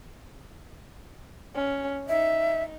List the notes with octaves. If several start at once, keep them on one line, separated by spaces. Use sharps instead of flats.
C#4
D#4 E5